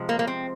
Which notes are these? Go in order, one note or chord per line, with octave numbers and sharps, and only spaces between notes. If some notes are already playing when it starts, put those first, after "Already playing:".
Already playing: C3 F3 G#3
A#3
A#3
C4